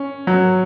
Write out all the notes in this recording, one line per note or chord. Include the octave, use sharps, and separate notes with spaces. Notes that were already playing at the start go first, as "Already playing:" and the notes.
Already playing: C#4
F#3